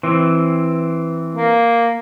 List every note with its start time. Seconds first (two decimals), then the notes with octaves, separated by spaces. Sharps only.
0.03 E3 C4
1.35 A#3